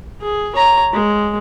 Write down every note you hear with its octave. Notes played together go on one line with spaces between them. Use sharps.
G#4
C#5 A#5
G#3